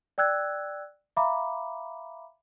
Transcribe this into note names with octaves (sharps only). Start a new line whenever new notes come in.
D5 G5 E6 F#6 G#6
E5 F5 A#5 B5 D6